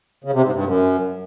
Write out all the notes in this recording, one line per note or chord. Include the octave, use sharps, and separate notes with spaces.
C#3
C3
G#2
G2
F#2